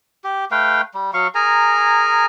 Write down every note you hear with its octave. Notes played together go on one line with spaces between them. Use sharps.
G4
A3 B4 F5 G5
G3
F#3 F5 C#6
G#4 A#4 G#5 A#5